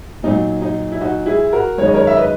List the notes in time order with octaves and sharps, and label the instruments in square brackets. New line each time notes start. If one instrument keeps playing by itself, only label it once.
[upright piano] A#2 F#3 D#4
D#4
E4
D#4 F#4
E4 G#4
F#4 A#4
F#2 D#3 G#3 C#5
D#5
A#4 C#5
E5
B4 D#5